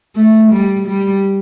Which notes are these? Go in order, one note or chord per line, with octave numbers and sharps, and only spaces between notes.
A3
G3
G3